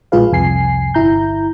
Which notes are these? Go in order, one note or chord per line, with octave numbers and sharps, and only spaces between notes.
A#1 G#3 F4 G#4 B4 F5
C2 F2 G#5 C7
G1 E4 A#5 G6